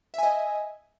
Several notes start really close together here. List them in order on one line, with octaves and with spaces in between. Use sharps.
E5 G#5 D#5